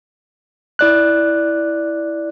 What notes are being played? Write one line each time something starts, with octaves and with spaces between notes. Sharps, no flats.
E4 D5 F#6